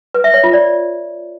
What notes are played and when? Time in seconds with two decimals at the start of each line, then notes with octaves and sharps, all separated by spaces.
0.14 B4
0.24 E5
0.34 C#5
0.44 F4
0.53 D5